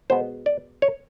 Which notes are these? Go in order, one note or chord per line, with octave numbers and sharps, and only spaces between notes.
B2 G#3 B3 C5
D5
C#5